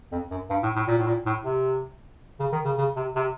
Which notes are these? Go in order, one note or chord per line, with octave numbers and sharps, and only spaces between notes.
F2
F#2
G2
A2
A2
A#2
A2
A#2
A2
C3
C#3
D#3
C#3
C#3
C3
C3